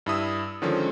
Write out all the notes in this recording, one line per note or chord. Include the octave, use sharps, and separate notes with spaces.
G2 E4 D#6 E6
D3 D#3 F3 G#3 C#4